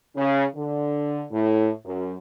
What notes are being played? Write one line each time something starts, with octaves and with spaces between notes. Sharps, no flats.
C#3
D3
A2
F#2